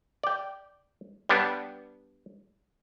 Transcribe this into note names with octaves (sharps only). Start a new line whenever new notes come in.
D5 G5
G3 B3 D4